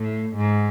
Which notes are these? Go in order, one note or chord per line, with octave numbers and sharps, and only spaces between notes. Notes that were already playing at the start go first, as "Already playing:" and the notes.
Already playing: A2
G#2